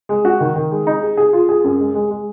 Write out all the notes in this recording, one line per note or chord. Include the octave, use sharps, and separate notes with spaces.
G#3
F#4
D#3
D#3
G#3
D#4
G#4
G#4
F4
G#4
F#2
G#3
G#3
G#3